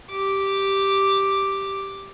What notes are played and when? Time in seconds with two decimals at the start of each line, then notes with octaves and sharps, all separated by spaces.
0.11 G4 D6